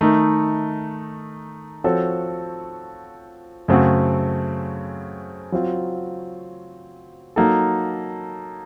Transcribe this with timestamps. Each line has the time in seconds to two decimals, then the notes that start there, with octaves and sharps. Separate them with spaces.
0.01 D#3 A3 D#4 A#4
1.84 F3 C4 F#4 A4 C#5
3.68 F#2 C#3 A3 C4 F#4
5.52 F#3 C4 F4
7.36 F#3 A#3 D#4 A4